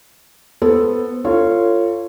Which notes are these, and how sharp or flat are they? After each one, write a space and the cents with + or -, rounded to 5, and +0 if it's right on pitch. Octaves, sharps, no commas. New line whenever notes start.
B3 +0 A4 +0 C5 +0
F4 -15 A4 +35 C#5 -10